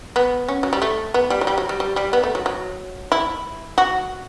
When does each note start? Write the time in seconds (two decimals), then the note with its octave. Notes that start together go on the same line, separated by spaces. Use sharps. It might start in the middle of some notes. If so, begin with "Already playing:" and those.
0.16 B3
0.49 C#4
0.63 F#3
0.73 G3
0.82 A3
1.14 B3
1.30 G3
1.41 F#3
1.47 G3
1.58 F#3
1.69 G3
1.80 G3
1.96 G3
2.13 B3
2.24 A3
2.35 F#3
2.46 F#3
3.12 E4
3.78 F#4